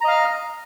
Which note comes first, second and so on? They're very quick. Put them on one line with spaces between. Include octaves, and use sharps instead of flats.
A#5 D#5 F5 F6